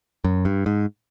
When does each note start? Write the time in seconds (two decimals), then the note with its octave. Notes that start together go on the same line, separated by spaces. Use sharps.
0.24 F#2
0.45 G2
0.66 G#2